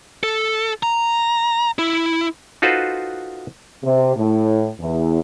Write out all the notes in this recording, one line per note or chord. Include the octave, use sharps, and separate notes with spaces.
A4
A#5
E4
D#4 F4 F#4 A4 B4 C5
C3
A2
E2